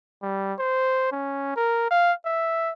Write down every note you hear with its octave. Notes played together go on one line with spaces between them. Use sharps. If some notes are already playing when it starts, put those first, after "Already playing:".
G3
C5
C#4
A#4
F5
E5